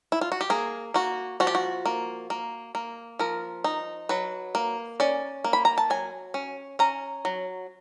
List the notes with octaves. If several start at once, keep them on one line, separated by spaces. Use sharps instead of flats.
E4
F4
F#4
G4
A#3 G#4
A#3 F#4
F3 F#4
G4
F#4
A#3
A#3
A#3
F3 A#4
D#4
F#3 B4
A#3
C#4 D5
A#3
B5
A#5
A5
F#3 G#5
C#4
C#4 A#5
F#3